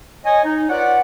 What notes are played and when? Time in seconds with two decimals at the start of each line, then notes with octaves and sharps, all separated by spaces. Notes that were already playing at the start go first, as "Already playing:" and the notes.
0.25 C#5 D#5 G#5
0.44 D#4
0.69 F4 B4 C#5 D5 F#5